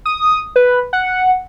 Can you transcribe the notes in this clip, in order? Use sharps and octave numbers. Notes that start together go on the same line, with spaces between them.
D#6
B4
F#5